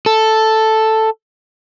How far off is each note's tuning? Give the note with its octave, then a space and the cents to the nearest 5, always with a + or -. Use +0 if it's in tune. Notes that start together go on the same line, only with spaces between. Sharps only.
A4 +0